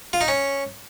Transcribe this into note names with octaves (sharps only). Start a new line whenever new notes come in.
F4
D#4
C#4